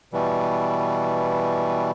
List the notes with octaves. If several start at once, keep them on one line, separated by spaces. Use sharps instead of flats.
B2 E3 G3